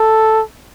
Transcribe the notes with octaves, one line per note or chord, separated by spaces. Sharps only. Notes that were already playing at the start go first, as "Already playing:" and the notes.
Already playing: A4